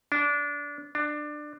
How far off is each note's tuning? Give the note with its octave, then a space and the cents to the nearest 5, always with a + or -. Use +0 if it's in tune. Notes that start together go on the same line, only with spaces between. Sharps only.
D4 -20
D4 +20